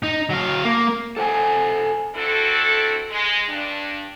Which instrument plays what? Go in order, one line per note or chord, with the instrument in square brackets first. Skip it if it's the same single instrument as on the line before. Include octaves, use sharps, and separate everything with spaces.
[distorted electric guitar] D#4
F#3 F5
A#3
[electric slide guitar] A4 C5 F#5 G#5
[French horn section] C4 D4 E4 F#4 A4
G#3
G2 D4